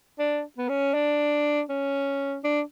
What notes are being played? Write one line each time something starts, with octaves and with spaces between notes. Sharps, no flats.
D4
B3
C#4
D4
C#4
D4